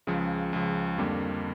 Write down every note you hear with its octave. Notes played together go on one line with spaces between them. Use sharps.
C#2 C#3 F3
C#2 C#3 F3
F2 D3 G3 A#3